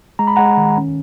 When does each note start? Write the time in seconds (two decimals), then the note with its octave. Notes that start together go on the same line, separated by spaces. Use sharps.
0.19 G#3 A#5
0.27 B5
0.36 G#3 F#5 A#5
0.57 D#3
0.77 C#4